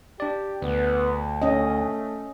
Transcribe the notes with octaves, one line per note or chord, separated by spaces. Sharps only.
D4 G4 D5
D2 B3
A3 C#4 D#5